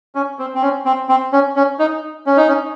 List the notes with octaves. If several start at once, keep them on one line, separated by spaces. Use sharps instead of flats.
C#4
C4
C4
C#4
C4
C4
C#4
C#4
D#4
C#4
D#4
C#4